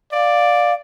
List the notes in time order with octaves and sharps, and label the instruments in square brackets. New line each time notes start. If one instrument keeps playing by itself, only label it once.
[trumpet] D5 [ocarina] F5